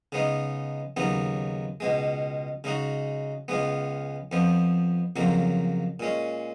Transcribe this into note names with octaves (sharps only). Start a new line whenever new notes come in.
C#3 G#3 B3 D#4
D#2 C#3 F#3 B3 D#4
C#2 B2 G#3
C#3 G#3 D#4 F#4
C#2 C#3 G#3 B3
F2 F3 B3
F2 C#3 F#3 A#3
A#2 G#3 C#4